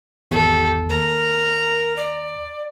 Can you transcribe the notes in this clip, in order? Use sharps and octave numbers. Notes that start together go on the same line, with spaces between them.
G#1 E2 G4 A4
D#2 A#4 A#5
D5